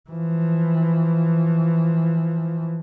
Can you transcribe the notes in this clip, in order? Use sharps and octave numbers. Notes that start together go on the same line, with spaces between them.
E3 F3